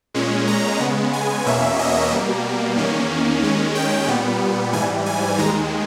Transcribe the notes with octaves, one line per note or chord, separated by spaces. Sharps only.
A#2 G#3 C#4
A#5
C#3 G#3 B3
G#5
E2 B2 A#3 C#4 E5
D#5
B2 G3 A#3
E2 D#3 A#3 C#4
D#2 D#3 G#3 C#4
G5
A#2 G3 B3
G#2 E3 G3 G#5
G#5
D#2 D#3 G#3 A#5